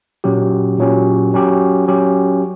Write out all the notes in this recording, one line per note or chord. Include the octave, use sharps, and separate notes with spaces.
A#2 F#3 C#4 G4
A#2 F#3 C#4 G4
F#3 C#4 G4
F#3 C#4 G4